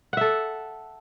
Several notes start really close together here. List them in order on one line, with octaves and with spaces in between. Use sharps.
F#5 E5 A4